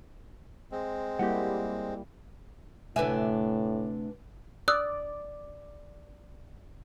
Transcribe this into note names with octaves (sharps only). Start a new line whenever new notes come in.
G#3 C4
G3 A#3 E4 G4 F#5
D2 A2 C3 D4 B4 E5 G#5
D5 D#6 E6 F#6